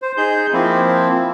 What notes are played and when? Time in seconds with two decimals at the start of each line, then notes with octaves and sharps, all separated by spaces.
0.02 C5
0.17 D#4 G#4 G6
0.53 F3 A#3 C4 E4